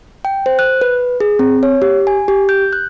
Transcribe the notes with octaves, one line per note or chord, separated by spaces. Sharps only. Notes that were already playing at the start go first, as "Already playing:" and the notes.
G5
C5
F#6
B4
G#4
C4
C#5
G4
G#5
G4
G6
F#6